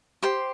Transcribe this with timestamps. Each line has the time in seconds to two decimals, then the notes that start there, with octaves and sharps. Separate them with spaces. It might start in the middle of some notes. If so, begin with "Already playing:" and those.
0.23 G4 C5 C6